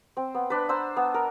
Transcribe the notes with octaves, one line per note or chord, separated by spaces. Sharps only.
C4
B3
D4 B4
C5 A#5 C6 E6
B3
A#4